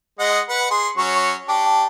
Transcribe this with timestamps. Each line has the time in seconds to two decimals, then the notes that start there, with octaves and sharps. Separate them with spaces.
0.19 G#3 D#5 F#5
0.49 B4 F#5
0.71 G#4 C6
0.98 F#3 C#4 C#6
1.48 D4 G4